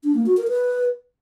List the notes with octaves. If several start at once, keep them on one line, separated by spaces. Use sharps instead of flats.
D4
A#3
F#4
A#4
B4